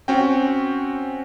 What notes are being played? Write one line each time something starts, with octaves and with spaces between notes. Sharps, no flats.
C4 C#4 F#4 G5